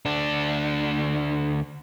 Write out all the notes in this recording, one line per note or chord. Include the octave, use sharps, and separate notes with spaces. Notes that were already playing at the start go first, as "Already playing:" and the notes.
D2 D4